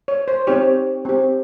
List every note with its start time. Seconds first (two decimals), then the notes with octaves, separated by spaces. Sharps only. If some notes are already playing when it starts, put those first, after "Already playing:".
0.08 C#5
0.28 C5
0.47 C4 D#4 G4 C#5
1.05 C4 G4